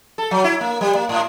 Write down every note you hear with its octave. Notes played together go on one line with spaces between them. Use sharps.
A4
F#3
E4
A#3
G3
A#3
A2